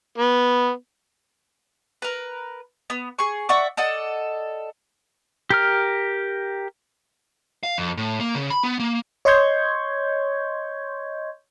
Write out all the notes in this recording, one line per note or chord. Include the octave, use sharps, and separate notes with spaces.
B3
A#4 B4
B3
G#4 C#6
D5 E5 F#5 C#6
A4 D5 D#5 F#5
G4 A#4 F6
F5
F2
A2
A#3
C#3
B5
B3
A#3
C#5 D#5 C6 C#6 G6 G#6